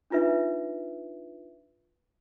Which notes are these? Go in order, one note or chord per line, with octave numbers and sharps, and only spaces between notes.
D4 D#4 F4 B4 E5